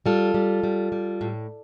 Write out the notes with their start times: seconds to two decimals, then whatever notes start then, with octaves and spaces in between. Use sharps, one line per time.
0.06 G3 F4 A4
0.34 G3
0.63 G3
0.92 G3
1.21 A2